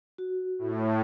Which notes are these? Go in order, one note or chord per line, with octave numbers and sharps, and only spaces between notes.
F#4
A2